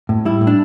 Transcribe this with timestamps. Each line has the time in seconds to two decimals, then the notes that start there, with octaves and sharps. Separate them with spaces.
0.09 A2
0.25 G3 E4
0.41 A2
0.47 D4